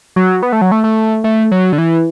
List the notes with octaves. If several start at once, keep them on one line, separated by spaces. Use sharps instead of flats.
F#3
B3
A3
F#3
A3
A3
A3
F#3
D3
E3